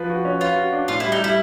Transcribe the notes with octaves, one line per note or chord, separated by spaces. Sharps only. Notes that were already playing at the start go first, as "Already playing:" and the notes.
Already playing: F3 B4
F#4
C#4
F4 B4
F#4
D4
A2 F4
G3 E4
D#4
G3 E4